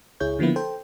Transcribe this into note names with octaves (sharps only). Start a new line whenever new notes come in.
C#2 E4 G#4 C#5 G6
D3 F3 A#3 B3 E4
A4 C5 G5